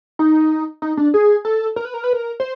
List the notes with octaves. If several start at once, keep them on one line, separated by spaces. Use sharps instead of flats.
D#4
D#4
D4
G#4
A4
A#4
B4
A#4
B4
A#4
C5